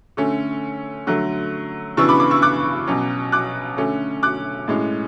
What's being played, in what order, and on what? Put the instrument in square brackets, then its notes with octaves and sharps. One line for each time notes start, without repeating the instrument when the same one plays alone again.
[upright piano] D3 A3 C#4
D3 F#3 A3
C#3 E3 B3 D4 C#6 E6
B5 D6
B5 D6
C#6 E6
D6 F#6
B2 F#3 C#4
D6 F#6
D3 A3 C#4
D6 F#6
A2 G#3 C#4